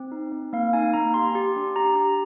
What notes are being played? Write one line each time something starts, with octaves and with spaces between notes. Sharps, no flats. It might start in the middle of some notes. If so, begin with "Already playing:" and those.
Already playing: C4
D#4
C4
A#3 F5
D#4 G#5
A#3 A#5
G4 C6
G4
D4
G4 A#5
G4